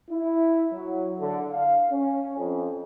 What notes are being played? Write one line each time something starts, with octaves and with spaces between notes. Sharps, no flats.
E4
F#3
D3
F5
C#4
F2